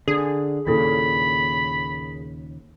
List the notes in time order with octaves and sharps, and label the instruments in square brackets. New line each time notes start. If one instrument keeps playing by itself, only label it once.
[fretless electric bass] D3 [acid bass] G#4
[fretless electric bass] D#2 A#2 C#3 [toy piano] D4 E4 A4 [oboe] B5